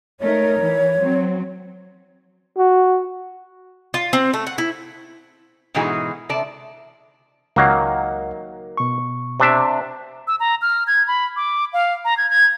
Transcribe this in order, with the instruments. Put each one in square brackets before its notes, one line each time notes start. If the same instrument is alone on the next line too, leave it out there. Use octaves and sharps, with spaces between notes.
[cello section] A3 D#4 A#4 [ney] C#5
[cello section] E3
F#3 C4
[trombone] F#4
[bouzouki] F4
C4
A3
F#5
E4
[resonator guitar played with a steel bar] G#2 B2 E3 D#4 F#4 G#4
C3 D5 A5
[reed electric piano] C#2 F#5 [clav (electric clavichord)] D#3 F#3 A#3
[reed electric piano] B2 C#6
[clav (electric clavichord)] C3 D4 E5
[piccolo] E6
A#5
F6
G#6
B5
D6
F5
A#5
G#6
G#6